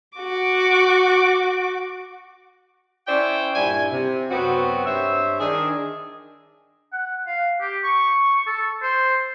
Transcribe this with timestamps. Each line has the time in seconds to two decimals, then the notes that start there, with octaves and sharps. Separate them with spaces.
0.18 F#4 D6
3.08 C#4 E4 C5 D5 E5 G5
3.55 G2 A#2 G3 E4 G#5
3.92 C3
4.30 F#2 F#3 B3 C4 F#4
4.85 G2 C5 C#5 E5
5.39 D#3 D4 G#4
6.92 F#5
7.27 F5
7.61 G4
7.84 C#6
8.47 A4
8.82 C5